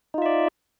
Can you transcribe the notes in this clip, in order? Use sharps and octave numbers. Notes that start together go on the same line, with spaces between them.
D#4 F4 D5 E5